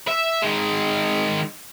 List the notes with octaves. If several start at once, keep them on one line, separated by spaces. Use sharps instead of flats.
E5
D#3 G#3